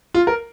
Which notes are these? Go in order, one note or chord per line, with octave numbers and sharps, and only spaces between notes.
F4
A#4